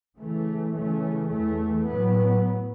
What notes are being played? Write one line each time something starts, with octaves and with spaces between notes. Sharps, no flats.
C#3 E3 A3
C#3 E3 A3 C#4
E2 E3 A3
A2 F#3 B3